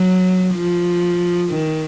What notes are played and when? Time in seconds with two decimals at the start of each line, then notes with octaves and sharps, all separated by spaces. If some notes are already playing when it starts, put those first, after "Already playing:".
Already playing: F#3
0.55 F3
1.50 D#3